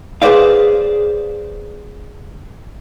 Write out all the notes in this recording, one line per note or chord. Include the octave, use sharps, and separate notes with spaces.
G#4 B4 C5 D5 F5